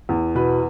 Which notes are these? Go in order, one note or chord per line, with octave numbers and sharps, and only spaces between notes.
E2
B2 B4